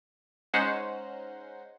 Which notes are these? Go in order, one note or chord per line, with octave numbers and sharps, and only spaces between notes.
G#3 C#4 D#4 C5 F#5